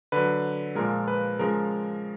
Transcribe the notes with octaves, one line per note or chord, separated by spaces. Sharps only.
D3 F#3 B4
A#2 F3 G#3 A#4
B4
C#3 F3 G#3 A#4